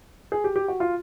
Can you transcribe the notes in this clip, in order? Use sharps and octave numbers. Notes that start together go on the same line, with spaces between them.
G#4
G4
G4
F#4
F4